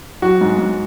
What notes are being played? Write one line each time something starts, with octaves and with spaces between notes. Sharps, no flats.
F#3 F#4
G#2
G#2